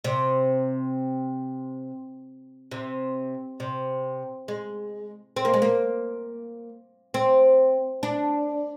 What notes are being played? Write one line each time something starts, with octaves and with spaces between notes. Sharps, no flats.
C3
C3
C3
G#3
C4
A#3
G#3
A#3
C4
D4